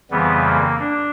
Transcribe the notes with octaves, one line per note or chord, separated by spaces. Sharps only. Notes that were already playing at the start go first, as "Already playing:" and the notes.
F2 C#3 E3 G3 B3
A#3
D4